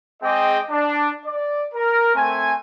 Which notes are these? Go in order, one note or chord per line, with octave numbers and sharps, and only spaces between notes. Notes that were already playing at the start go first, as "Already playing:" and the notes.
G#3 C4 G#4 D#5 G5 D6
D4
D5
A#4
A3 C4 G#5